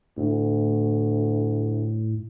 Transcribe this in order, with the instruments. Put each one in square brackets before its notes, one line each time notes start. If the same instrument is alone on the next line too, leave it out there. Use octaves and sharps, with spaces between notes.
[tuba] D2 [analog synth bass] A2